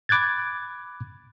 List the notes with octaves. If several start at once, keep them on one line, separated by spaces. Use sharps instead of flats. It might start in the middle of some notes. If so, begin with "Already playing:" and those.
B5 D6 F#6 G#6 A6